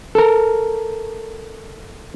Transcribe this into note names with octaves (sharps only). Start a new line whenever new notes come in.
A4 A#4